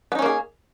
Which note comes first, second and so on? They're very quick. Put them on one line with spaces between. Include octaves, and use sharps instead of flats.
B3 D#4 C#4 A#3 G#4